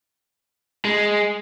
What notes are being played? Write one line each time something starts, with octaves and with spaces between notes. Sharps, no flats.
G#3